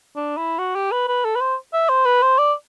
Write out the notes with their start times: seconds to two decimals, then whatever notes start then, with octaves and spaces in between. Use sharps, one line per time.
0.16 D4
0.37 E4
0.59 F#4
0.75 G4
0.92 B4
1.08 B4
1.25 A4
1.36 B4
1.41 C5
1.74 E5
1.89 C5
2.06 B4
2.22 C5
2.39 D5